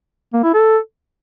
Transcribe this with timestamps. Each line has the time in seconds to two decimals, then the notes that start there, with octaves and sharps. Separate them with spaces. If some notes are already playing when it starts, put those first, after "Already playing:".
0.33 A#3
0.44 E4
0.54 A4